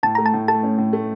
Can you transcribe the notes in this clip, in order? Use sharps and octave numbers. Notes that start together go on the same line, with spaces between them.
A2 A5
A3 A#5
A5
A2
A3 A5
C#4
A2
A3